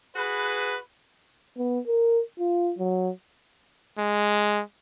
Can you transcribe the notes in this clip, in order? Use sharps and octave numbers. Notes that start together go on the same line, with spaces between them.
F#4 G#4 B4
B3
A#4
F4
F#3
G#3